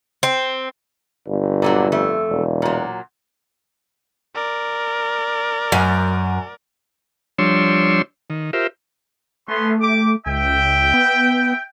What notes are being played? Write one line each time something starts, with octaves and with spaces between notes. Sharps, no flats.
C4
G1
A#2 D3 F#3
F2 A3
E1
A#2 F#3
A#4 D5
F#2
F3 G3 D4 C#5 C6 E6
D#3
F4 G4 A#4 C5 E5
A3 B3 C#4 C6
G4 D6
C#2 E5 G5
B3